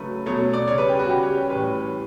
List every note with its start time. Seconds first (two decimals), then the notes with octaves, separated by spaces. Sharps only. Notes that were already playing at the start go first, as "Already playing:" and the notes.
Already playing: C#3 F#3 A3 B4
0.26 B2 F#3 A3 C#5
0.53 D5
0.68 C#3 G3 C#5
0.78 B4
0.89 G4
0.99 F#4
1.09 C#3 G3 G4
1.23 C#5
1.37 G4
1.50 A2 E3 G3 B4